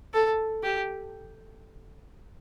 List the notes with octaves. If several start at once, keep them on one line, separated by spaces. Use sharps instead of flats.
A4
G4